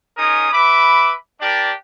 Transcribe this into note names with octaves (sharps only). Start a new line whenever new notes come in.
C#4 D#4 G#4 A#4 D#6
B4 E5 B5 D6
D4 G4 A#4 D5